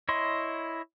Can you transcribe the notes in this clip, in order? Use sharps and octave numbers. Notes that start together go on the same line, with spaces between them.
E4 C#5 D#5 C6